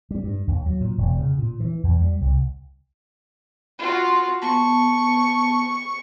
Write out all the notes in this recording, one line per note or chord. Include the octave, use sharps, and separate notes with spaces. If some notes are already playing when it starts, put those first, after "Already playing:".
G3
G2
D#2
F#3
A#2
E1
C#3
A#2
E3
E2
G3
C2
F4 F#4
B3 A5 C#6